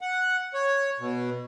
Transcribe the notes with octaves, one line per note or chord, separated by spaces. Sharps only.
F#5
C#5
B2